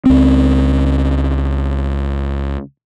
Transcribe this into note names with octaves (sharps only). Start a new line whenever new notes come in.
C#2 C4